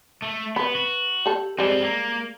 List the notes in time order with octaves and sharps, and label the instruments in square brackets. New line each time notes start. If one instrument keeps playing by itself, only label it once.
[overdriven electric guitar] A3
[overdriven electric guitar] B3 [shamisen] B4 B5
[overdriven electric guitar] F#4
[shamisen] G4 A4
[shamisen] G3 G#3 [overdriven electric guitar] C4 A4
[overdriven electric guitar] A#3